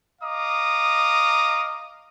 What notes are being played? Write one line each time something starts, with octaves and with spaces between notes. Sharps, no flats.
D#5 F5 A#5 D6 D#6